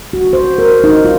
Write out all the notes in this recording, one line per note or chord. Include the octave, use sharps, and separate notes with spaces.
F#4
C5
A#4
D#4
F4